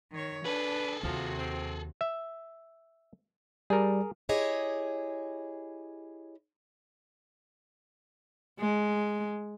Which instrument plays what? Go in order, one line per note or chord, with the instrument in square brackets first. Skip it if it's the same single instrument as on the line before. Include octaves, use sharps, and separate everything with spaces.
[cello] D#3 C#5
[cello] D4 [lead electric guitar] G#4 A4 [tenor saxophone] B4
[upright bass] D#2 [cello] C3 F#4 [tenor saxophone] F3
[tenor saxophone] C4
[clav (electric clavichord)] E5
[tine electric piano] G3 [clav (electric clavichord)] G#4 A#4
[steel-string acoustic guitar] E4 G4 G#4 C#5 D#5
[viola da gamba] G#3